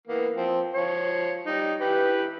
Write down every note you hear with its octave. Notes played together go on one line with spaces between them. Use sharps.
E3 A#3 B3
F3 C4
F3 C#5
G3 D#4
E3 G4 B4